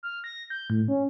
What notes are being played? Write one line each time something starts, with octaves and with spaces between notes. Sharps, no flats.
F6
A#6
G6
A2
C#4